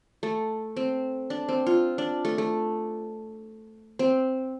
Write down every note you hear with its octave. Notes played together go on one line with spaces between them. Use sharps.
A3
C4
D4
C4
F4
D4
A3
A3
C4